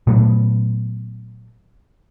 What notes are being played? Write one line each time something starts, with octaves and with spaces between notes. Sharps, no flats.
A#2 F#3 A3 B3